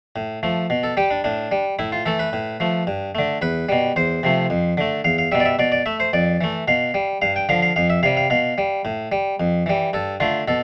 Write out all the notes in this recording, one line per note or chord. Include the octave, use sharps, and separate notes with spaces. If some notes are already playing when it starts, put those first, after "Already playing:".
A2
F3 A3
B2
A4
G3 G4
D4
A2 D4
G3
A2 E4
F4
E3 A3 A4
B4
A2
F3 A3
G2
D3 A3
E2 B4
B2 G3
E2 C5
C3 F3 A3
F2
D3 A3
E2 F5
F5
B2 G3 E5
D5
E5
B2 D5
D5
A3 E5
C5
F2 D5
E3 A3
B2 F5
G3
G2 F5
G5
D3 F3 F5
F5
F2 F5
E5
C3 G3 F5
F5
B2 F5
G3
A2
G3
F2
E3 G3
G2 A4
D3 A3 F4
B2 A4